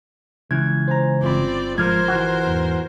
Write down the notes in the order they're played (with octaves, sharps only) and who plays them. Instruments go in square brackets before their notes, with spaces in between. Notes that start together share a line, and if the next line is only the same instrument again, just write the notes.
[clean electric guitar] C#2 E3 [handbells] G#6
[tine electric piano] C5 G#5 A#5
[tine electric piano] G1 F4 B5 [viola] C4 D5
[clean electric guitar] G#2 F3 [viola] A#4 C5 [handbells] F6 G#6
[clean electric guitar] E3 F#4
[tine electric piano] E2 G#2